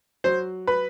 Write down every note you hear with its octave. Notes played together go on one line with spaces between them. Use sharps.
F#3 C5
B4